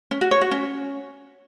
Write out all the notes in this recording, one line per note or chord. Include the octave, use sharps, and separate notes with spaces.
C#4
F#4
C#5
F#4
C#4